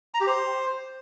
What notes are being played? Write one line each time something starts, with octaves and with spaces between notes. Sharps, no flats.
A#5
G4
C5